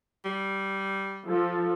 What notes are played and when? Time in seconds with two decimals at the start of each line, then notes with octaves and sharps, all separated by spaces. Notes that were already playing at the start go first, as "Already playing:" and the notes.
0.25 G3
1.27 F3 A4